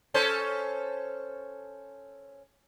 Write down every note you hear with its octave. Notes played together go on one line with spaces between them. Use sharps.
C#4 A4 C5